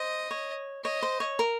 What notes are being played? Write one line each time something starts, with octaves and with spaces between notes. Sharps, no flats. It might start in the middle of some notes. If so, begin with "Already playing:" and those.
Already playing: C5 D#5
C#5
C#5 D#5
C5
C#5
A#4